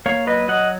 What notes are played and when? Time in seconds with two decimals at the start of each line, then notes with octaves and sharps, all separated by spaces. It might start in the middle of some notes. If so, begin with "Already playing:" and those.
0.06 A#3 C#5 F5
0.27 F#3 B4 D#5
0.48 F#3 D#5 F#5